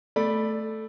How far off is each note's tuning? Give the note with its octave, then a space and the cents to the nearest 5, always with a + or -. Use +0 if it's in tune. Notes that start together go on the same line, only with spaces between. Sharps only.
A3 +0 D5 +15 B5 -5